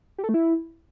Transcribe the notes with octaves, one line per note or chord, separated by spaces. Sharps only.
G4
A4
A3
E4